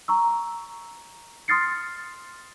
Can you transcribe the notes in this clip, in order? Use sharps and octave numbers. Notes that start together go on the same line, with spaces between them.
A#5 C#6 E6
C6 D#6 F6 A6 C7 C#7